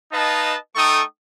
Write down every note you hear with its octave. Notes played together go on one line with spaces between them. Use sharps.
D#4 B4 D#5 F5 A5
A3 D#4 A4 G5 C#6 D#6